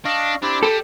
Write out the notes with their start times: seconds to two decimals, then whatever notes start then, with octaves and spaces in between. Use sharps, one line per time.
0.05 D4 D#5 F5 C#6
0.42 C4 D4 E4 G4
0.63 G3 A4